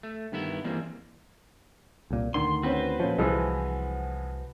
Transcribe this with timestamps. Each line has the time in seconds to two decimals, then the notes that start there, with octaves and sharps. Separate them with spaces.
0.03 A3
0.32 G2 D#3 B3 E4
0.64 E3 G3 G#3 A#3 C4
2.11 C2 A#2
2.34 D2 D3 D#3 C6
2.63 C4 C#4 F#4 B4 C5
3.00 A#2 F3 C#4
3.18 C2 E3 F3 G#3